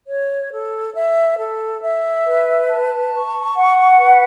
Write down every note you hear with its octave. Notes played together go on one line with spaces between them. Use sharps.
C#5
A4
E5
A4
E5
B4
A5
C#6
F#5
B4